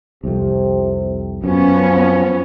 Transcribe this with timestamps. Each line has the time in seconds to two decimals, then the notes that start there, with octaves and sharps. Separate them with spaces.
0.24 C2 F2 C3
1.44 F#2 F3 B3 C#4